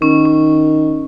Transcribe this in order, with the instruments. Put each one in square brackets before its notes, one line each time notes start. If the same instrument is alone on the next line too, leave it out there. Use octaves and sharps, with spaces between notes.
[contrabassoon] D#3 [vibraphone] C#4
[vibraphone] C#4